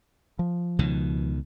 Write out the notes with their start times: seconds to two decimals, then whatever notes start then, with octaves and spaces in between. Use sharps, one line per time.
0.39 F3
0.79 C#2 B2 D#3